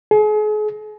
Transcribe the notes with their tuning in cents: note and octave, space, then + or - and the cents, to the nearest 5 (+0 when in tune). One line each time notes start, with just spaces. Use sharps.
G#4 +40